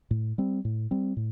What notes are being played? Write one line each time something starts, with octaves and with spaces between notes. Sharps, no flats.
A2
G3 C4
A2
G3 C4
A2